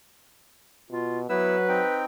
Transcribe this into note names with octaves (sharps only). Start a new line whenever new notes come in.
B2 F4
F#3 B3 E4 B4 E6
C4 D#4 G5